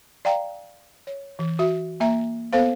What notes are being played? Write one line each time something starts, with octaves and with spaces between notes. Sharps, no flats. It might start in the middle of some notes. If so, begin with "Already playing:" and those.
D5 F5 G5 A#5
C#5
E3
F#4 E5
A#3 E5 A#5
B3 A4 C5 F5